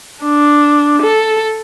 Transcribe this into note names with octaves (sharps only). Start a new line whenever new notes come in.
D4
A4